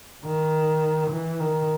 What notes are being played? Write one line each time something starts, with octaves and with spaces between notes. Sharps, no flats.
D#3
E3
D#3